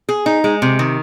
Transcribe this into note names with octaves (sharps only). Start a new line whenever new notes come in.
G#4
D#4
G#3
C3
D#3